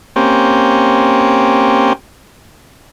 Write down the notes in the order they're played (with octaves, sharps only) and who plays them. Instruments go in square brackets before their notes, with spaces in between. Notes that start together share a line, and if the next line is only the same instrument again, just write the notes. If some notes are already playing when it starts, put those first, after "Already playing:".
[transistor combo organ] A#3 C4 C#4 G4